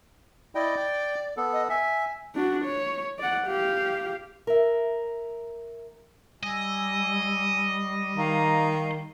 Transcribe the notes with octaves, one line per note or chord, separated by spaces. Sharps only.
E4 D5 D#5 G5
G5
B3 A4
D#5
E5 G#5
D4 F#4
C#5
D5 F#5
G4 F5
A#4 E5
G3 D#5 G#5 E6
D#3 F5 A#5